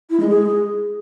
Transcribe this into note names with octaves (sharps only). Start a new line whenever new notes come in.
E4
G#3
G#4